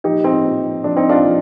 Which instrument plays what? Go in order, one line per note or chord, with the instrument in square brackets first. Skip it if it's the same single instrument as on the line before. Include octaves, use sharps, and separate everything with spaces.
[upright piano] A#2 F3 D#4 G4
C4 D#4
A#2 F3
A#2 F3 D4
C4 D#4
D4 F4
A#2 F3